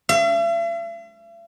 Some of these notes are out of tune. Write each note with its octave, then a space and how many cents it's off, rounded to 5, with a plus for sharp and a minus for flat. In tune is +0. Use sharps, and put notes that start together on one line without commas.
E5 +45